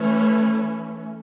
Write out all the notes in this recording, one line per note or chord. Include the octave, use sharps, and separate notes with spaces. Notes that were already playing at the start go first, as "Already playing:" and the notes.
Already playing: E3 A3 C#4